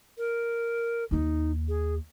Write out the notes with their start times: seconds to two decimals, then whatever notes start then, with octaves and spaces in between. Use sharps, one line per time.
0.17 A#4
1.11 D#2 D#4 E4
1.68 G#4